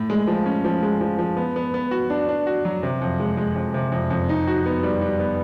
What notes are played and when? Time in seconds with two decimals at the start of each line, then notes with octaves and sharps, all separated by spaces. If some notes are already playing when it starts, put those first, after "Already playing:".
Already playing: A2
0.10 G#3
0.27 F3
0.46 C#4
0.65 F3
0.83 G#3
1.01 F3
1.19 F3
1.37 B3
1.56 B3
1.74 B3
1.91 F#4
2.10 D4
2.29 D4
2.47 F#4
2.65 F#3
2.83 C3
3.01 F2
3.20 G#3
3.37 G#3
3.56 F2
3.74 C3
3.92 F2
4.11 F2
4.29 D#4
4.47 F#4
4.66 B3
4.83 G3
5.01 G3
5.19 B3